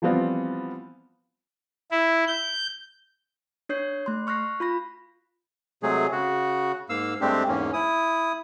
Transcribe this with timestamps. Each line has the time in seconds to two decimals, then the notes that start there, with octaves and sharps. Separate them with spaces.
0.02 E3 F3 G3 B3 C4 F4
1.91 E4
2.28 G6
3.69 D4 C#5 G6 C7
4.06 A3 C6
4.27 C#6 F6 F#6 A#6 C7
4.60 F4 B5 A#6
5.83 C3 F#3 G#3 A3 G#4
6.12 C#3 F#4
6.90 G#2 A#3 F5 E6
7.21 G2 G#3 A3 C4 D4 G4
7.48 E2 G#2 A#3 C#4
7.73 E4 D#6